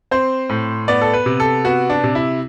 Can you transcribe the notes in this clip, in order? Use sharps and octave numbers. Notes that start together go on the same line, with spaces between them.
C4 C5
A2
B3 D5
A4
B4
C3
A4
B3 F#4
D4
C3
E4